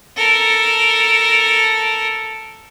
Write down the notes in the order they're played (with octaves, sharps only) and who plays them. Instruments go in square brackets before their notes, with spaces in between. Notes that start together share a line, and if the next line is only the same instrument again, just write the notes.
[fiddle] A4 A#4